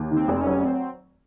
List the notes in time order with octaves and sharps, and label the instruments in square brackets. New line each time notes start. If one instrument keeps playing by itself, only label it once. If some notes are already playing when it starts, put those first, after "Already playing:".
Already playing: [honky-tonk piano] D#2
D#3
[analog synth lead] C4
[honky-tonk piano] F1
[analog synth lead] C#4
[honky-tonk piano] F#3
[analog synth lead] C4